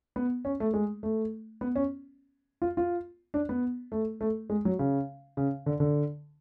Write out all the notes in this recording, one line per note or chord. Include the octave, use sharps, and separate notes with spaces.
B3
C#4
A3
G#3
A3
B3
C#4
F4
F4
D4
B3
A3
A3
G#3
F#3
C#3
C#3
D3
D3